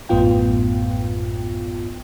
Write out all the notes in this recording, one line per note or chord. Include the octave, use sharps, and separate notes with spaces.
A1 F#2 A2 B3 F4 G5